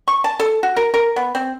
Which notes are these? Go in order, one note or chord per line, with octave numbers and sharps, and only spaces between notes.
C#6
A5
A4
F#4
A#4
A#4
B3
C4